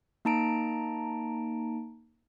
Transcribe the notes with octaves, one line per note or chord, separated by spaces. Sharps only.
A#3 D#4 A5 A#5 D7